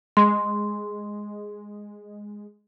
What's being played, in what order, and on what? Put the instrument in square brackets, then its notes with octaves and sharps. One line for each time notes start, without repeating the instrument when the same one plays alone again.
[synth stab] G#3 [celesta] C6